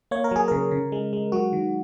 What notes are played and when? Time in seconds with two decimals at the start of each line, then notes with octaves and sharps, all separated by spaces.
0.11 A#3 C#5
0.24 A#4
0.31 F#3 G#4
0.48 C#3 A#4
0.72 C#3
0.92 G#3
1.13 G#3
1.32 F#3 F#4
1.53 D#3